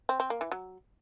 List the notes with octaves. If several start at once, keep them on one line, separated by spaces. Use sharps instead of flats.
C4
C4
A#3
E3
F#3